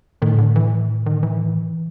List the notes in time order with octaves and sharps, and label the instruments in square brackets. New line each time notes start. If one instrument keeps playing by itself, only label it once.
[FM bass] A2 [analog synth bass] D#3
[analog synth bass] D3
E3
D#3
E3